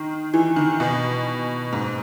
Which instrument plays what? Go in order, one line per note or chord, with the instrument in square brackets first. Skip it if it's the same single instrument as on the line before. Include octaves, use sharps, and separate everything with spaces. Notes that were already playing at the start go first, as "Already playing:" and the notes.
Already playing: [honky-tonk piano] D#3
E3
D#3
B2
G#2